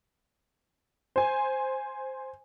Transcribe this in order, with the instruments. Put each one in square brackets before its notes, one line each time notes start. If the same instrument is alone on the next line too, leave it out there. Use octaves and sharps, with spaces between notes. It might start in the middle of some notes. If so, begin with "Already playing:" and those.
[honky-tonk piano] C5 G#5